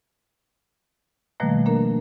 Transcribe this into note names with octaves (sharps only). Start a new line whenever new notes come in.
B2 D#3 F3 G3 A3 A#3
A#3 D4 A#4